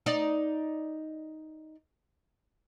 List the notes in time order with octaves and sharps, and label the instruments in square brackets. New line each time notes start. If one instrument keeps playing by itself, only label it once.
[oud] D#4 D5 D#5